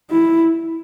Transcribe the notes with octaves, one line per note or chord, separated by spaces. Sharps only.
E4